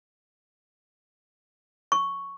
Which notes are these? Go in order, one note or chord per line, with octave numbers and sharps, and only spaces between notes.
C#6